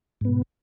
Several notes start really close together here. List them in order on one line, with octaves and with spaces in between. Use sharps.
G#2 B3 B2